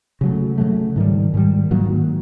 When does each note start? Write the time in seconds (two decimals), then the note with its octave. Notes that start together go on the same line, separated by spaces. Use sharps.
0.21 C#3 F#3 A3
0.58 C#3 F#3 A3
0.96 G#2 D#3 G3
1.34 G#2 D#3 G3
1.71 G#2 D#3 F#3 A#3